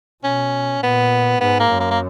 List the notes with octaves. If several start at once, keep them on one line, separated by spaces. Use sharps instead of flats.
B2 C#4
A#2 B3
G#2 B3
A#3
F#2
A#3
A#3